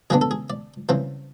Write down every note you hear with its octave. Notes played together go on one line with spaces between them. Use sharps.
F#2 C#3 F#3 B3 D4 G#4
A4
G#4
D5
F#2 C#3 E3 G3 C4